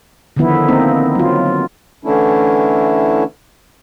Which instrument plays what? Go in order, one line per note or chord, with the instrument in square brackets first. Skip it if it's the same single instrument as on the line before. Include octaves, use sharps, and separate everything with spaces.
[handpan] D3 D#3 F3 B3 E4
A#3 C4 D#4
F#3 F4
[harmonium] D3 E3 A3 C#4 D4 E4